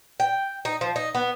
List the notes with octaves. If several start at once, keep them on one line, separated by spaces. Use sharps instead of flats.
G5
D#4
F3
D#4
B3